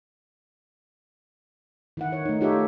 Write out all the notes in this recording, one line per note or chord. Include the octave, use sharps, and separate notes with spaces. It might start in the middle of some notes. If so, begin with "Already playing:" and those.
D#3 E4 F#5
C#5
A3 D#4
D#4 F4 G4 A4 C#5 E5